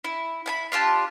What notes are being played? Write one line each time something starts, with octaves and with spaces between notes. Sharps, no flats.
E4
E4 G#5 B5
D4 F4 G4 A5